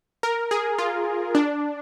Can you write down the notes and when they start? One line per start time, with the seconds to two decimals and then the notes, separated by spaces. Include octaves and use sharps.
0.23 A#4
0.51 G#4
0.78 F4
1.35 D4